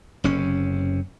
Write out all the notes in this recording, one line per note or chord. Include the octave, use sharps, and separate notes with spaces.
F#1 C3 C#4